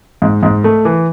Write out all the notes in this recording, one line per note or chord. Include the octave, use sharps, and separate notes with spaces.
G#2
G#2
A3
E3